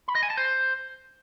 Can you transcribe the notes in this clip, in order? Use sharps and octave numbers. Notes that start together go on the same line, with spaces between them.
B5
D#5
G#5
A5
C5